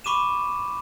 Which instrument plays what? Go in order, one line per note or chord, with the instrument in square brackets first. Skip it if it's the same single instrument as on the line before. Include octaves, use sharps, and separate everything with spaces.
[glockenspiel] B5 C#6 D6 D#7 E7